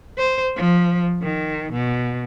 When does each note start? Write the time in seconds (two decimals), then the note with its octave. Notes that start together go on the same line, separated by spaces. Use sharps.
0.18 C5
0.57 F3
1.23 D#3
1.73 B2